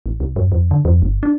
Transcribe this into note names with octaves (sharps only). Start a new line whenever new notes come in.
A1
C2
F#2
F2
D3
F2
G1
D4